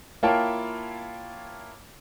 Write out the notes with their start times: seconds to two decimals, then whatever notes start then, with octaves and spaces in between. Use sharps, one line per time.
0.23 A#3 E4 F4 C#5 G5 A5